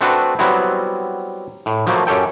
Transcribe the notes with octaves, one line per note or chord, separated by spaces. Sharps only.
A3 C4 D4 F#4 A4 B4
F#3 G3 B3 C4 E4
A2
F3 F#3 A3 A#3
F#2 C#4 G4 A4 G5